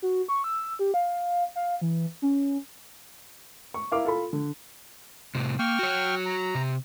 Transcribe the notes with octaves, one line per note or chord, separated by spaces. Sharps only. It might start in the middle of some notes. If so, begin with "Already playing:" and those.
F#4
C#6
E6
G4
F5
F5
E3
C#4
C#6
E4 A#4 F5 D6
F4 A4 B5
D3
A2 C3
A#3 G5 C#6 F6
F#4 C#5
A#5
C3